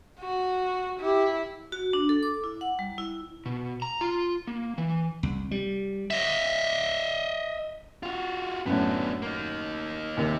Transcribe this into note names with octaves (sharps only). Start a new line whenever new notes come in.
F#4
E4 G4
F#4
D4
A4
D6
E4
F#5
G3
E4
B2
A#5
F4
A#3
E3
C2
G3
D#5 E5
F4 F#4
F#2 A2 B3 D4
A#3 D#4
D#2 C3 A#3